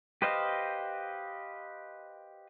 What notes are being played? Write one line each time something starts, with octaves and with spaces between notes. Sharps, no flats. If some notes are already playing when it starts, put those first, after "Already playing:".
G4 B4 C5 D#5 F5